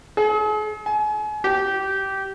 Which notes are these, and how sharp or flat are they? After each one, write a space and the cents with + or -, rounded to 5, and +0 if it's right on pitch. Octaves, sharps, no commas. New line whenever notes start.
G#4 +45
G#5 +35
G4 -20